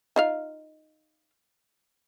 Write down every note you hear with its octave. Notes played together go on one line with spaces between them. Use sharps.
D#4 F4 F5